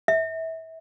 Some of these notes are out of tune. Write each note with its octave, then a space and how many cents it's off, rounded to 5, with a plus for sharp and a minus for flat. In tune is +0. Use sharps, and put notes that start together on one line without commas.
E5 -25